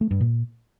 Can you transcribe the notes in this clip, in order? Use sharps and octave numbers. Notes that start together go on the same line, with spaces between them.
A3
G2
A#2